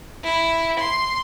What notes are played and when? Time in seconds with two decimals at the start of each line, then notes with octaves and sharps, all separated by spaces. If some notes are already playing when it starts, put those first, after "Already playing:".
0.24 E4
0.80 C6